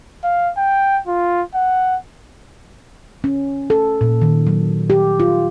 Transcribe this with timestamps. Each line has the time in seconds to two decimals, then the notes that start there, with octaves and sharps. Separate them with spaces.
0.24 F5
0.57 G5
1.07 F4
1.54 F#5
3.24 C#4
3.70 A4
4.01 A#2
4.22 D#3
4.47 F#3
4.90 G4
5.20 F4